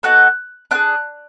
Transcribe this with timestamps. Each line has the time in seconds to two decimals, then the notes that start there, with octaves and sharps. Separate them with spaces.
0.03 B3 D#4 F#4 A4 F#6
0.71 D4 F4 G#4 F#6